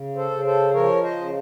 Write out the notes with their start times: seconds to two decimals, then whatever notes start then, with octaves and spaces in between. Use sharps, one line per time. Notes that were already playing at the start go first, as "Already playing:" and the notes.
Already playing: C#3
0.16 A4 C5
0.31 C#3
0.45 A4 C5
0.74 F3 A#4 C#5
1.02 C5 D#5
1.16 C#3